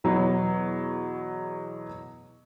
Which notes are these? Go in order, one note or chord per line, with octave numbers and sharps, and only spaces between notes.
E2 B2 F#3 B3 C#5